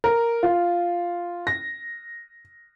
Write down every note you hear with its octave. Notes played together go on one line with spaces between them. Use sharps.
A#4
F4
A#6